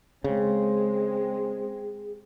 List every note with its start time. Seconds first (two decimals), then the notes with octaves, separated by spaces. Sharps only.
0.24 C#3 G#3 C4 G#4